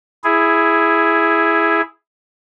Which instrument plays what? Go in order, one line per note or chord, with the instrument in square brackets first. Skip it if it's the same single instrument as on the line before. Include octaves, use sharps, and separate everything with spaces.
[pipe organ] E4 G#4